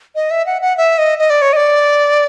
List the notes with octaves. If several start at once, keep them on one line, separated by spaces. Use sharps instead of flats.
D#5
E5
F#5
F#5
E5
D#5
D#5
D5
C#5
D#5
D5